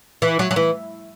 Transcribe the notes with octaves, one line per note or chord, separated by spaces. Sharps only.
E3
F#3
F#3
E3